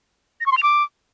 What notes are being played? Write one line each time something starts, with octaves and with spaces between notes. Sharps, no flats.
A#6
C#6
C6
F7
D6